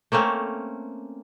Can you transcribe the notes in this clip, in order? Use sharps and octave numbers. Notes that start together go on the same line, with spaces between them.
A3 A#3 C4 C#4